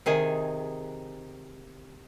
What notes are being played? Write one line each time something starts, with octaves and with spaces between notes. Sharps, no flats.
C3 D#3 G#4